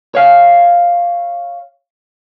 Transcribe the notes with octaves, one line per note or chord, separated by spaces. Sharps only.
C#5 F5